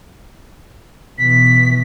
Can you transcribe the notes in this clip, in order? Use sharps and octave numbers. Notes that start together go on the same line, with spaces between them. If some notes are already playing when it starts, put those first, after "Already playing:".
B2 E3 B6